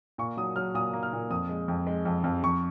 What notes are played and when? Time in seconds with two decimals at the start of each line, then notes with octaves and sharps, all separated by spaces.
0.18 A#2 C#6
0.37 F#3 D#6
0.56 F#3 F6
0.74 A#2 D#6
0.93 A#3
1.03 F6
1.13 A#2
1.30 F2 D#6
1.49 G#3
1.68 F2
1.87 G#3
2.05 F2
2.24 F2
2.43 F2 C#6